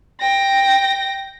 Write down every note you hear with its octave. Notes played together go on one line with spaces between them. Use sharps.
G5 A#6